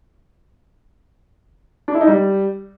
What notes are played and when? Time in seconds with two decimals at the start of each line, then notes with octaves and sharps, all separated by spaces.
1.88 D4
1.94 E4
2.01 D#4
2.07 G3